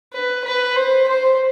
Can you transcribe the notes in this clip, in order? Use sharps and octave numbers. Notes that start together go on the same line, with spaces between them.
B4
B4
C5
C5